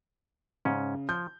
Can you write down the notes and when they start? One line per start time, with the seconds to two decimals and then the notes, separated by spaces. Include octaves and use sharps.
0.65 G#2 C#3 C#4
1.09 F3 G6